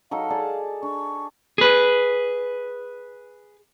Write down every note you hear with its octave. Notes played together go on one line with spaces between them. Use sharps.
F#3 D#4 A4 F5
G#4 D5 A5
D4 C#6
G#4 B4